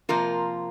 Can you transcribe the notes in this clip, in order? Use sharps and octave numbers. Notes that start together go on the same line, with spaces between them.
C3 F3 A#3 F4 A#4